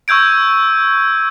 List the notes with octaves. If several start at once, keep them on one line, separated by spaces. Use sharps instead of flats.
C#6 E6 G6 G#6 D7